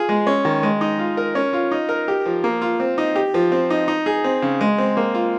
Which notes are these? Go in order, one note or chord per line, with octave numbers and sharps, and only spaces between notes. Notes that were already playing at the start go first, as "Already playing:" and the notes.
Already playing: F4 G#4
G#3
C#4
D#3
G#3
D#4
F4
A#4
C#4
F4
D#4
A#4
G4
F3
A#3
F4
C4
D#4
G4
F3
C4
D#4
D#4
G#4
C4
C#3
G#3
C4
A#3
F4